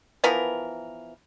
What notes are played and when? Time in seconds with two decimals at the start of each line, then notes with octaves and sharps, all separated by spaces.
0.24 E3 F3 B3 A#4